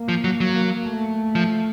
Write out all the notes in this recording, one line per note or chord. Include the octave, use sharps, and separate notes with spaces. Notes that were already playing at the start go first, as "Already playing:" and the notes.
Already playing: A#3
F3
F#3
F#3
A3
F3